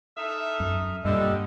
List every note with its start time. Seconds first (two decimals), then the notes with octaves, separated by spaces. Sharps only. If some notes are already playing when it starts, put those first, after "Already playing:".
0.17 D#4 A4 E5 D#6 F6
0.60 F#2
1.05 G2 A#2 D3 G3 D#5 E6